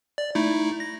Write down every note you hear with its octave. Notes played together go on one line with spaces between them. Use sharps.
D5
A3 D#4 E4
A#6